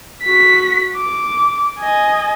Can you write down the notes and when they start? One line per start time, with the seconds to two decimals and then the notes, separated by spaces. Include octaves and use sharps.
0.23 F#4 B6
0.97 D6
1.79 D#5 G#5